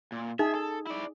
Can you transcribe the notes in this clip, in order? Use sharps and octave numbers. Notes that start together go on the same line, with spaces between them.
A#2
D#4 G#4 E5
A4
E4 D5